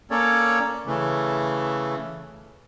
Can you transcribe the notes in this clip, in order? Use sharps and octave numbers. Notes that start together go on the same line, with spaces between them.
A#3 C#4 A4 C#5 D5
C#3 E3 A3